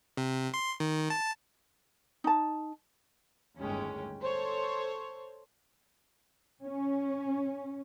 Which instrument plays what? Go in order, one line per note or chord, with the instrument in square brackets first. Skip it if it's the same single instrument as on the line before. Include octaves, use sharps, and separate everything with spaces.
[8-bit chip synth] C3
C6
D#3
A5
[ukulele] D#4 A5
[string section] G1 D#2 A2 G#3 C#4 G5
A4 C5 C#5
[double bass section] C#4